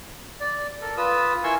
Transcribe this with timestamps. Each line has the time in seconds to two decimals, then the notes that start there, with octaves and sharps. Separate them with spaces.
0.40 D5
0.81 A4 A#4
0.97 F4 B4 D#6 E6
1.44 E4 A#4 G#5 C6 C#6 E6